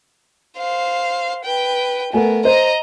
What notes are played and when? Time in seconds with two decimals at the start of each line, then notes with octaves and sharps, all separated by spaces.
0.57 C5 F5
1.44 B4 G5
2.13 A3 B3 A#4 G#5
2.45 C5 D#5 A#5